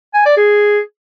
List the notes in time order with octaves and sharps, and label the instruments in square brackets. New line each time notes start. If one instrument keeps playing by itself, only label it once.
[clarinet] G#5
D5
G#4